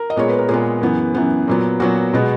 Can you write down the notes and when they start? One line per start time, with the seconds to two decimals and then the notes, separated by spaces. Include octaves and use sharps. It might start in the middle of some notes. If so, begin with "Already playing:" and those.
Already playing: A#4
0.10 D#5
0.16 A#2 G#3 B3 C#5
0.29 B4
0.39 A#4
0.49 A#2 G#3 B3 G#4
0.81 F#2 E3 B3
1.14 F#2 E3 B3
1.48 A#2 F#3 B3
1.80 A#2 F#3 B3 F#4
2.14 B2 G#3 B3